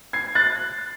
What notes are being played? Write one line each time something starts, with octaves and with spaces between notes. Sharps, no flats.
G#6 C7
F#6 A6